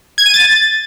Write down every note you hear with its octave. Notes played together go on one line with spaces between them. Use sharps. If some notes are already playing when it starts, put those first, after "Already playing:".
G#6
D#7
A6